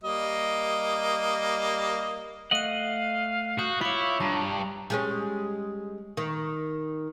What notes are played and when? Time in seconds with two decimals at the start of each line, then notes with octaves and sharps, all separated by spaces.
0.03 G3 A#3 D#5
2.51 A3 D#5 F5 F#5 F#6 D#7
3.59 F#4 D#6 F#6 G6
3.81 E4 F4 C#5 C#6 D6
4.20 G2 A5 A#5
4.90 G3 G#3 C#4
6.17 D#3